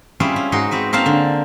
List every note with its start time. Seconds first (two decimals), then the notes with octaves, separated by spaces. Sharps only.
0.20 G3 C4 C#4 E4 F4 G#4
0.36 C#4
0.52 G#2 D#4 F#4 C6
0.71 C4 F#4 B4
0.93 A#3 C4 C#4 F5 A5
1.06 D3